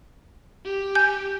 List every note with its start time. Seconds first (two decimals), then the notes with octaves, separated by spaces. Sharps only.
0.64 G4
0.95 G#5 G6